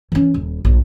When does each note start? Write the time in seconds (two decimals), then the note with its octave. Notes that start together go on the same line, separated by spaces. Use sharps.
0.12 E3 C#4
0.34 D#1
0.65 A#1